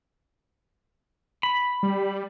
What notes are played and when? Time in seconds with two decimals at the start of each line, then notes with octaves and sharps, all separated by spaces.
1.43 B5
1.83 G3